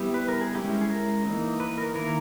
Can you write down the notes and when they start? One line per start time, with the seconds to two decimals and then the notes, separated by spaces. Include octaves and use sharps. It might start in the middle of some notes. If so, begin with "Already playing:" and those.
Already playing: G3 B3 E4 G4
0.14 B4
0.28 A#4
0.41 G#4
0.55 G#3 C#4 E4 G4
0.81 G#4
0.90 A#4
1.25 E3 A#3 D#4
1.60 B4
1.78 A#4
1.95 D#3 A#3 E4 A#4